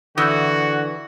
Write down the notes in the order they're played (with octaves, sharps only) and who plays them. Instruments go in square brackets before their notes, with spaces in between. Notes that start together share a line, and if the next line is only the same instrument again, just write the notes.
[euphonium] D3 [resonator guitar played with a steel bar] E3 [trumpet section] F#4 [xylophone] D#6 E6 G6